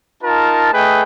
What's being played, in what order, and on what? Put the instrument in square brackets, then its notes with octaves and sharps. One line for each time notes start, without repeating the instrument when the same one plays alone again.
[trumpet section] D#4 F4 A#4 A5
A3 G#4 B4 D#5 G5